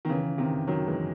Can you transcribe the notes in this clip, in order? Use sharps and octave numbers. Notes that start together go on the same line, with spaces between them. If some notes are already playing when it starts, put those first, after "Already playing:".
D#3
C#3 E3
C3 D#3
D#3 F#3
E3 G#3